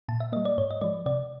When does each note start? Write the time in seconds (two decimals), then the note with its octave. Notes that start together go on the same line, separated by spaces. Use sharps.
0.08 A#2 A5
0.20 E5
0.32 G3 A#3 D#5
0.45 D5
0.58 G#2 C#5
0.71 D#5
0.81 F3 G#3 D5
1.06 C3 D5